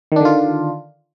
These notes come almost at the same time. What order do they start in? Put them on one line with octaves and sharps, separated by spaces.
D#3 D4 D3 F4